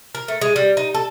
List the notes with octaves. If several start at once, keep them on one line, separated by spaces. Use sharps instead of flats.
A#4
A3
G#3
G3
D#4
A4